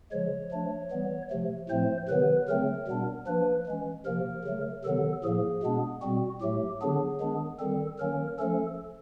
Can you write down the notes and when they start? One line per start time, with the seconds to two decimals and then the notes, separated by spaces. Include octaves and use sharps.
0.12 C#3 F3 G#3 C#5
0.51 F3 A3 D4
0.91 E3 G3 B3
1.30 C3 F3 A3
1.69 A2 F3 A3 C4 C5
2.08 C3 D#3 F#3 B3 B4
2.48 C#3 F#3 A3 C4 A#4
2.87 B2 G3 B3 D4
3.27 F3 A#3 D4 B4
3.66 E3 G#3 C#4
4.05 C3 F3 A#3 A#4
4.44 C#3 F#3 A3
4.84 C3 D#3 F#3 B3 A4
5.24 A2 F3 A#3 G#4
5.63 B2 G#3 B3 D4
6.02 B2 G3 C4 F#4
6.41 A2 F#3 A3 G4
6.81 D3 F#3 B3 D4 G#4
7.20 D#3 G#3 B3 D4
7.59 D#3 G3 C4 A4
7.99 D#3 F#3 A#3 C#4 A#4
8.39 F3 A3 C#4 A4